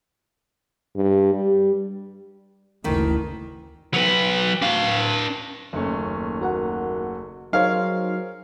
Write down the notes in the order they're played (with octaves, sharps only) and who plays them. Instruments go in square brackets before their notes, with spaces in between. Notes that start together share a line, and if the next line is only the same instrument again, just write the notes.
[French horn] G2
G3
[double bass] F#1 D2 [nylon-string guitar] D#3 E3
[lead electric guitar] F#3 B4
D4 F5
[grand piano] F#1 A3 C#4 [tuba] D#2
[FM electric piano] F#4 A#4 F#5
[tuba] F#3 [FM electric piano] D#4 C5 [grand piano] G#4 A#4 C#5 [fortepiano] F5